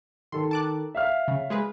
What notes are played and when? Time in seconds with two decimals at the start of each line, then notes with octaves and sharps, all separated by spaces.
0.32 D#3 A4 C6
0.51 A5 D6 F#6
0.95 E5 F5 F6
1.28 C#3
1.50 G#3 G#4 B4